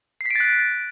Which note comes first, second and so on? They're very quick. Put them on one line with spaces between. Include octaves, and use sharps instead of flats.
C7 B6 D7 A6 F#6